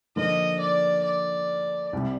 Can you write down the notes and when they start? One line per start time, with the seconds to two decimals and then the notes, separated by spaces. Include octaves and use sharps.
0.16 D3 F3 A#3 D#5
0.60 D5
1.05 D5
1.93 C2 C3 G3